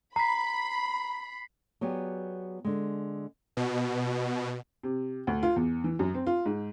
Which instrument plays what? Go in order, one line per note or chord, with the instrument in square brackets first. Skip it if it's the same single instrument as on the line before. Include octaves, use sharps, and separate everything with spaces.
[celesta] A#5 [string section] B5 [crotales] B6 C7
[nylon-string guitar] F#3 B3 G4 G#4 D5
D3 G#3
[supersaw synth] B2
[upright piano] C3
D2
F4
E2
E3
F#2
C4
F4
G#2